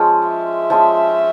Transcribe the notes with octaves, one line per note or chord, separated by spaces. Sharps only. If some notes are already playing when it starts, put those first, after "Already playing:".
Already playing: F3 G#3 C#4
E5
F3 G#3 C#4